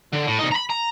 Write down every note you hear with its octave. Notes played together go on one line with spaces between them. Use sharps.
D3
A2
C2 D#4
A#5 B5
A#5